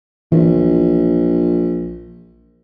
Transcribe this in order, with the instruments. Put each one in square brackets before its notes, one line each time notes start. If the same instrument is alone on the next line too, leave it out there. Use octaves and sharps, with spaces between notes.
[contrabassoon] A#1 [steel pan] E3